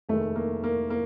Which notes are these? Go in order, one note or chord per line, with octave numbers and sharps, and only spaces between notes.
F1 D#2 D#3 G#3 A3
A#3
A#3
A#3